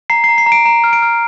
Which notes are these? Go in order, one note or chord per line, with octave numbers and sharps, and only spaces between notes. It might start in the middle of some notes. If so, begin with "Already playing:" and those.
A#5 C7
A#5 C7
C7
A#5
D7
A#5
F6
D7
F6